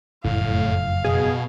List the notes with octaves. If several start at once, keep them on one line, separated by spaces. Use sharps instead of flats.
F#1 F2 A2 F5
B2 G#4